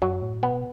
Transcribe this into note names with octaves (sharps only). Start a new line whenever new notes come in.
F#2 F#3
A2
B2 B3